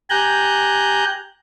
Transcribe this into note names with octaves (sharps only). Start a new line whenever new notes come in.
G4 G#5 A#5 F#6 G6